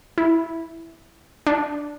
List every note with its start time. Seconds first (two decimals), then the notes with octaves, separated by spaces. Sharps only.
0.18 E4
1.47 D4